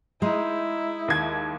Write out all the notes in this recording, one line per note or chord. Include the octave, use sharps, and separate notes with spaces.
G#3 D#4 E4
D#2 G#6